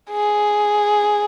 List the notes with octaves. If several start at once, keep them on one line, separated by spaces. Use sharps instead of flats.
G#4